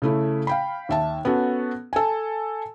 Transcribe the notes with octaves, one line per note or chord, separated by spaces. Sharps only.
C#3 A3 E4
F5 G5 B5
D#2 E5 A5
B3 C#4 F#4 A4
A4 G#5